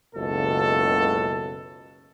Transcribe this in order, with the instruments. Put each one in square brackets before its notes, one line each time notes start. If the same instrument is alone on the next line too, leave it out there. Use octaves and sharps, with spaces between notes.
[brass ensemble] F#1 C#2 B2 A4